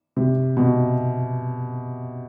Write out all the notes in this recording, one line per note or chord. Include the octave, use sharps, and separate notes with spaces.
C3
B2